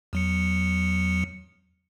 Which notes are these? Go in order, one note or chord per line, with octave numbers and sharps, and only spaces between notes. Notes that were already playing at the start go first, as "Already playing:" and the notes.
E2 F#3 C#7